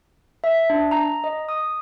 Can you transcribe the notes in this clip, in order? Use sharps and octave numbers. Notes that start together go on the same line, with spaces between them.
E5
D4
A#5
D#5
D#6